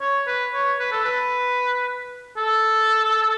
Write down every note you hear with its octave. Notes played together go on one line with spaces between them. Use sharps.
C#5
B4
C#5
B4
A4
B4
A4